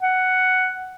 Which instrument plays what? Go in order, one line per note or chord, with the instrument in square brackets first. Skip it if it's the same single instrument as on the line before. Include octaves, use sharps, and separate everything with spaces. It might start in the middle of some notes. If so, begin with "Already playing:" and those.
[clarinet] F#5